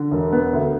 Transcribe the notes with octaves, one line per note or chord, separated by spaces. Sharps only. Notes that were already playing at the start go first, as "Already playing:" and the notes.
Already playing: D3
E1
B3
D2